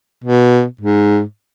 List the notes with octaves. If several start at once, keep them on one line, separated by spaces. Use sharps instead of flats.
B2
G#2